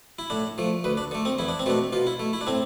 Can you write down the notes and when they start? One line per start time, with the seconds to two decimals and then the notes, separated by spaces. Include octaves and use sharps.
0.19 E4
0.30 A2 D4
0.58 F3 A3
0.84 D2 B4
0.97 D4
1.11 D3 A3
1.25 C4
1.38 E2 E4
1.48 D4
1.59 C4
1.66 B2 A3 D4
1.93 B2 F4
2.07 E4
2.20 A3
2.33 E4
2.41 D4
2.47 A2 C4